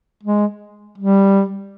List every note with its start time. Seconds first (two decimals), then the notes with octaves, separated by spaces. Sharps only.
0.23 G#3
0.98 G3